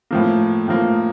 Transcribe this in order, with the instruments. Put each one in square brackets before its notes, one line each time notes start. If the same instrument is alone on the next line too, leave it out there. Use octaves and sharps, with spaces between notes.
[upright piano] A2 F3 A#3
A2 F3 A#3